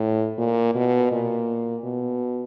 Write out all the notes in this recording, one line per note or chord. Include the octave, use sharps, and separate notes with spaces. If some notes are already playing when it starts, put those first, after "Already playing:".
Already playing: A2
A#2
B2
A#2
B2